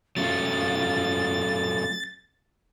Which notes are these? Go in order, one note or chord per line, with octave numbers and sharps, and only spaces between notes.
F#3 A3 C#4 F4 A6